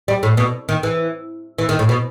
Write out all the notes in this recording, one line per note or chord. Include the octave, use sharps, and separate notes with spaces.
G3
A2
B2
D#3
E3
E3
D#3
A2
B2